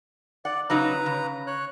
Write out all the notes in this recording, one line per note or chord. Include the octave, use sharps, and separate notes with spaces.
D5 F#5
C#3 F#3 D#4 B4 A#5
C#3
C#5 F#6